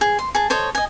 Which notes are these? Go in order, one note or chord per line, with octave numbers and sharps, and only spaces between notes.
G#4
C6
G#4 A5
A4 C5 C#5 D#5
D#5 G#5